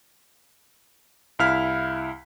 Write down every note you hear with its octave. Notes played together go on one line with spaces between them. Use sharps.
C2 E4 F5 F6 B6